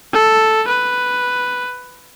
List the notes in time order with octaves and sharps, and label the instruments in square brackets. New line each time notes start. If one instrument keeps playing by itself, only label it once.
[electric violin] A4
B4